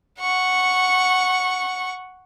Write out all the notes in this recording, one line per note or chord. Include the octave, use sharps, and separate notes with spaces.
F#5 C#6